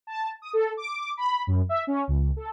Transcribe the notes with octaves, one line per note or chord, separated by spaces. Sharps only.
A5
D#6
A4
D6
B5
F#2
E5
C#4
C#2
A4